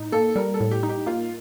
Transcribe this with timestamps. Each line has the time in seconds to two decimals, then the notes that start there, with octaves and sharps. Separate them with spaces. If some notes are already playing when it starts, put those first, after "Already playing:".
Already playing: A2 D#4
0.12 A#3 A4
0.36 G3 A#4
0.54 A4
0.60 A2
0.71 G4
0.83 D#4
0.89 G4
1.06 A#3 F4